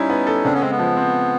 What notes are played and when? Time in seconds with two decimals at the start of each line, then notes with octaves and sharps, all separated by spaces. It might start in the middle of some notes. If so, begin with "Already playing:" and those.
Already playing: G3 C#4 D#4 E4
0.10 B3
0.27 A4
0.44 C#3 C4 D4
0.53 B3 C#4
0.62 G#3 C4
0.71 B3
0.79 F3
0.97 C4